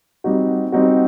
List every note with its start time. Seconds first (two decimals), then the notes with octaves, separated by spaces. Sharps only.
0.24 G3 C4 D#4 F#4
0.72 G3 C4 D#4 F#4